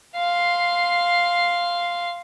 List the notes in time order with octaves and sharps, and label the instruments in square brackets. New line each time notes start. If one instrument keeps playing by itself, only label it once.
[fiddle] F5 C6